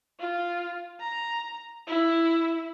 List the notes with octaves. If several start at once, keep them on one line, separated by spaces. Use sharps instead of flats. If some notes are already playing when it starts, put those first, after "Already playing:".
F4
A#5
E4